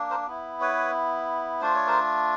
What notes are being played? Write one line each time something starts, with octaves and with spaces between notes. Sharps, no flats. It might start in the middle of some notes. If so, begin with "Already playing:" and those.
Already playing: A#3 D4
A#4 C5
B3 E4
B4 C#5
A3 D4 F4 C5
C#5
A#4 C5